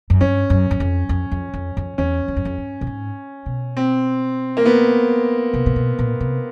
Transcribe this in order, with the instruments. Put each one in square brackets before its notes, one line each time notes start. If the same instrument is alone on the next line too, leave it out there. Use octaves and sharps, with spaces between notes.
[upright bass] F#2
[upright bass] G2 [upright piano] C#4
[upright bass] F#2
F#2
F2
F2
F2
F2
F2
[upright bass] E2 [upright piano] C#4
[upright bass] F2
F#2
F2
G2
A2
G#2
B2
[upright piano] C4
A#3
B3
[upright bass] C3
C3
B2
A#2
C3